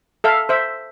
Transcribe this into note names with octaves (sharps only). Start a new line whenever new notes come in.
A4 E5 F5
C5 E5